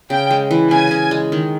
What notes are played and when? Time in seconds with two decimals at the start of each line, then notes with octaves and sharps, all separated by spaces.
0.10 C#3 G5
0.31 G#3
0.51 E3
0.71 C#3 G#5
0.91 C#3
1.11 G#3
1.32 D#3